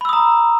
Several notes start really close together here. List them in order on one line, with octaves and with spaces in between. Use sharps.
B5 E6 D#6 A#5